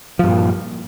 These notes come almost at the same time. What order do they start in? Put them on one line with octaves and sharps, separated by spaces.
F3 G2 A#2